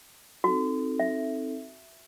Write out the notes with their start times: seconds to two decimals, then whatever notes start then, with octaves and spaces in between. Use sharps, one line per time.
0.44 C4 D#4 F#4 A4
0.99 E5